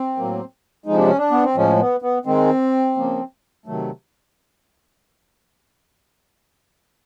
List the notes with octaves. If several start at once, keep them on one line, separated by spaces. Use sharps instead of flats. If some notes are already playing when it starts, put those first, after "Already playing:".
Already playing: C4
A2 F#3 A#3
C3 F3 G#3 D#4
D4
C#4
D4
B3
C4
A2 F3 G#3 C#4
B3
B3
D#3 G#3 C4
C#3 F3 A#3
C3 D#3 F#3 A3